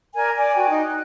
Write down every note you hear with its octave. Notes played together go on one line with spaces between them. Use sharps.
A#4 D5 G#5
D5 G#5
F#4 G5 G#5
D#4
F#6